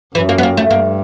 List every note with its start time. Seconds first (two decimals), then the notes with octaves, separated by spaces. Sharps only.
0.15 F#2 E3
0.29 A#3
0.38 B3
0.43 A#3
0.57 A3
0.70 G2 A#3